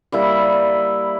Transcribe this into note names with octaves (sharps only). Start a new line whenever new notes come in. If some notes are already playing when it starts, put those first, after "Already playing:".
G3 A#3 E4